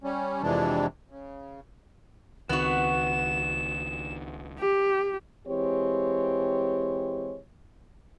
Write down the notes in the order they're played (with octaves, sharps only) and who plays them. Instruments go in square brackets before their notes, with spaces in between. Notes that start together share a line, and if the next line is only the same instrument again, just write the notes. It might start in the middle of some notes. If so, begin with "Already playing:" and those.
[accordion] G3 C#4
F2 C3 E3 G#3 D4
C#3
[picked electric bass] C#2 D#3 C4 [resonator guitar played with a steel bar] B3 F#4 [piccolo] E7
[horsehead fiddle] G4
[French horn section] E3 G#3 C4 G4 C#5